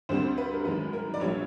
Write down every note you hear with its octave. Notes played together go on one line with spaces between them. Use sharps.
D2 D3 G3 C4 C5
B4
A#4
F#2 D#3 G#3 B4
A#4
D5
A#1 A#2 G3 B3 D4 C#5